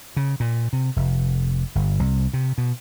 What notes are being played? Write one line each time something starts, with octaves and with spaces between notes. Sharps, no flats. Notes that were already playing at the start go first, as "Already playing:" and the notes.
C#3
A#2
C3
F1
G1
C2
C3
B2